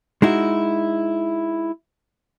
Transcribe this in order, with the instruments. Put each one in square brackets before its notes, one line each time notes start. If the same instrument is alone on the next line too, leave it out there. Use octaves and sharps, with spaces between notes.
[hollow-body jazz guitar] G#3 D#4 E4 F#4